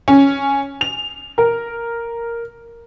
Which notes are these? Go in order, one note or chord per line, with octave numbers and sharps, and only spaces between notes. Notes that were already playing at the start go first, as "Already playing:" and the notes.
C#4
F7
A#4